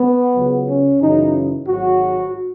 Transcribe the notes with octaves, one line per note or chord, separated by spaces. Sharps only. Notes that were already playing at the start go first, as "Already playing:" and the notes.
Already playing: B3
C#2 C#3 F#3
C#4
F#2 C#3 E3 D#4
G#1 G#2 F#3 F#4